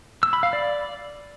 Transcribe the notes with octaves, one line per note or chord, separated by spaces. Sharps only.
E6
B5
F5
D5